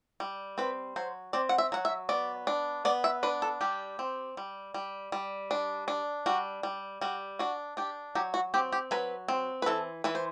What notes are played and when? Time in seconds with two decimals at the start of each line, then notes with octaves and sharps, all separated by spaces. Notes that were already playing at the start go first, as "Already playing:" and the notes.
0.20 G3
0.58 C4 B4
0.96 F#3 C5
1.33 C4 D5
1.49 F#5
1.58 E5
1.72 F#3 F#5
1.85 E5
2.09 B3 D5
2.47 D4
2.85 B3 D5
3.04 E5
3.23 D4 B4
3.42 A4
3.61 G3 G4
3.99 C4
4.37 G3
4.74 G3
5.12 G3
5.51 D4
5.88 D4
6.26 G3 F#4
6.63 G3
7.01 G3 F#4
7.39 D4 F#4
7.77 D4 G4
8.15 F#3 G4
8.34 F#4
8.54 C4 G4
8.72 G4
8.91 F#3 B4
9.28 C4
9.62 B4
9.66 E3 A4
10.04 E3 B4
10.15 C5